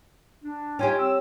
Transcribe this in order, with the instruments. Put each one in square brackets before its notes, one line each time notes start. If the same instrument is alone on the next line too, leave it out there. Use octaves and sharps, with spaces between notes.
[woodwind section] D4
[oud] C#4 F4 G4 [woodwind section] D#4 G5 G#5
[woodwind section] C4 E6